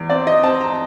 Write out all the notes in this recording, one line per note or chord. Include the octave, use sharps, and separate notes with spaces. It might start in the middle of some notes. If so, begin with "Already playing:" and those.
Already playing: E2
C4 D5
D#5
C4 A5
A#5